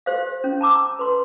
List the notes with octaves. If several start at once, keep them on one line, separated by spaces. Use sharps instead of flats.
G4 C5 F5
C#4
A5 A#5 D6 E6
B4 C6